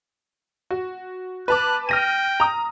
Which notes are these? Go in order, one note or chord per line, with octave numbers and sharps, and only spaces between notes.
F#4
B4 A5 D6 F#6
G5 F6 A#6 D#7
A#5 D#6